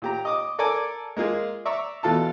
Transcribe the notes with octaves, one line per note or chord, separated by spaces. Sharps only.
A#2 G4 A#5
D#5 D6 D#6
A4 A#4 D5 G#5 D6
G#3 A#3 F4 G#4
D5 E5 A#5 C#6 E6
E2 B2 F4 A4 A5